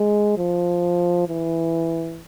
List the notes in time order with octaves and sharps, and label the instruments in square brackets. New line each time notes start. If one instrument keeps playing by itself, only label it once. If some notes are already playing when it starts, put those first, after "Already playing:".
Already playing: [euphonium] G#3
F3
E3